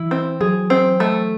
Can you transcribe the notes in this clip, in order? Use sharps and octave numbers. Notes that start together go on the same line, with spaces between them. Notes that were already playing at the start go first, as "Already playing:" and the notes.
Already playing: E3 E4
C4
F#3 G#4
C4
A3